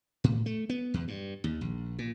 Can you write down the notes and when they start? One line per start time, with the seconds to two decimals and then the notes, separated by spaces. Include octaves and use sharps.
0.24 A2
0.46 A3
0.70 B3
0.94 E2
1.08 G2
1.44 D#2
1.61 A#1
1.99 A#2